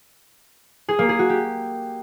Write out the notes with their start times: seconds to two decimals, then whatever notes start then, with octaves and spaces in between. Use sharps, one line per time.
0.89 G#4
0.99 A#3
1.09 G#4
1.19 F#4
1.29 G4